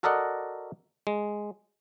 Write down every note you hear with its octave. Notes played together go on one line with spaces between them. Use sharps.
F#4 A4 A#4 D5 D#5 F#5
G#3